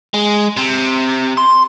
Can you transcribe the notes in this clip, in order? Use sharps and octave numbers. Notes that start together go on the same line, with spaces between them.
G#3
C3
C6